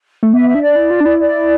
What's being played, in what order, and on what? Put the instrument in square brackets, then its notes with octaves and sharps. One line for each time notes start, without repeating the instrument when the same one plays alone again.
[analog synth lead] A3
[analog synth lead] B3 [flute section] E5
[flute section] E5
[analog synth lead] D4
[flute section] D5
[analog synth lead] E4
F4
D4
E4
[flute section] D5